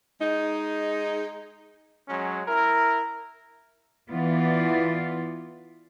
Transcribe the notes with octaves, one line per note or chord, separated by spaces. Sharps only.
G#3 D#4
F#3 G#3 C#4
E4 A#4
E3 B3 F4 D5